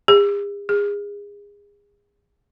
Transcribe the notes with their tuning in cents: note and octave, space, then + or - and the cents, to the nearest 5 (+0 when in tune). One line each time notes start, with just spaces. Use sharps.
G#4 -45
G#4 -30